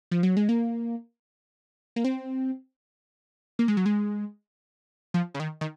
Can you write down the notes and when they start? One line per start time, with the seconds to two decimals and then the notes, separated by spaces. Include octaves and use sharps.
0.11 F3
0.23 F#3
0.37 G#3
0.49 A#3
1.96 A#3
2.04 C4
3.59 A#3
3.68 G#3
3.77 F#3
3.86 G#3
5.14 F3
5.34 C#3
5.40 D#3
5.61 D#3